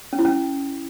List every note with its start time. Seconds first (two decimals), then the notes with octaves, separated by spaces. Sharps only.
0.13 C#4
0.19 E4
0.25 C#4